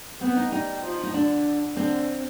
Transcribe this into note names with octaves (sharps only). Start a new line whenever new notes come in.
B3 C4
D#4
G3 D#4
F3
D#4
D3 D4
D3 C4